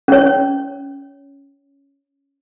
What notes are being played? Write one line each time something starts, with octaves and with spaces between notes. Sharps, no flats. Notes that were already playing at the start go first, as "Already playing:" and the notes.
C#4 C#5